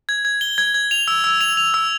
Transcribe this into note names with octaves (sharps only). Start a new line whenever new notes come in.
G#6
G#6
G7
G#6
G#6
F7
E6
E6
F7
F7
E6